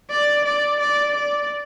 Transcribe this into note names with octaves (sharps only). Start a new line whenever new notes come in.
D5
D5
D5
D5